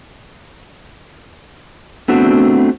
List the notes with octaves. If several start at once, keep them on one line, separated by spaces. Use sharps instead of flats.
A3 B3 C4 D4 F#4